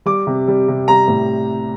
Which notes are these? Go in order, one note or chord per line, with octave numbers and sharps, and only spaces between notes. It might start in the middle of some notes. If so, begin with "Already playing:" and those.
G3 D6
C3
G3
C3
G3 A#5
A2